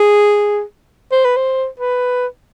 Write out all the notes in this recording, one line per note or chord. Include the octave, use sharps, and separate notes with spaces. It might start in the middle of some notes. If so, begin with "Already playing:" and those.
Already playing: G#4
C5
B4
C5
B4